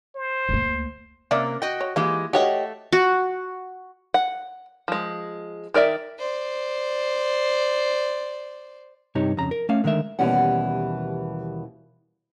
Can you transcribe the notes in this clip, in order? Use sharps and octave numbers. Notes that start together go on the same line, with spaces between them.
C5
D2 A#3
C3 A#3 C#4 D5 E5
F#4 D#5 G5
C#5
E3 G#3 A#3 E4 F4 G4
A3 F#4 G4 C#5 D#5 F5
F#4
F#5
F3 G#3
D#3 A#4 D5 E5
C5 D5
G2 C3 D#4 G4 C#5
F2 C#3 A#5
A#4
A3 C#4 F5
D3 D#3 G#3 A#4 E5
D#2 B2 E3 G3 C#4 F#5